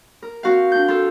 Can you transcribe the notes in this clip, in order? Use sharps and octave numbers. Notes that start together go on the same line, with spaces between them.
A#4
C4 F#4 F5
D4 G6
F4 A4